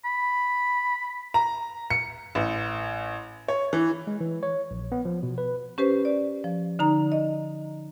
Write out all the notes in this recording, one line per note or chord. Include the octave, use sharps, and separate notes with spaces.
B5
A#5
C#7
A1
C#5
E3
G#3
E3
C#5
A#1
B3
F3
B2
B4
C#4 G4 B4 C5
D5
F3
D3 D#4 A#5
D#5